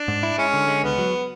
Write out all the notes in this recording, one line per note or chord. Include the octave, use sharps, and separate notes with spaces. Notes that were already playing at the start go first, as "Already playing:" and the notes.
Already playing: D4
G#2
E4
G#3 C#4
D3
G#3
C#2 B3
F#3